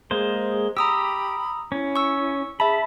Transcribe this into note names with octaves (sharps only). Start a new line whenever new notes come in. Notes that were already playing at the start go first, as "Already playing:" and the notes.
G#3 A#3 G#4 C5
G4 A#5 B5 D#6 E6
C#4 E4
C#6 E6
G#4 E5 A5 B5